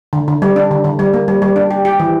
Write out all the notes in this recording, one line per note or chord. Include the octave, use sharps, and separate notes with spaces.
D3
D3
G3
D4
D3
D3
G3
A#3
G3
G3
D4
G4
G4
E3